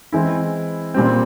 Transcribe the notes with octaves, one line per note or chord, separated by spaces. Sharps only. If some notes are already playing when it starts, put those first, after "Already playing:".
E3 G#3 C4 E4
A#2 G3 C4